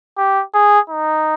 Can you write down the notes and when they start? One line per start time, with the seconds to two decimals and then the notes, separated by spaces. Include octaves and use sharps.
0.18 G4
0.54 G#4
0.90 D#4